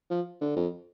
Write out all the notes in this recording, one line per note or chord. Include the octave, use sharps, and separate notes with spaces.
F3
D3
F2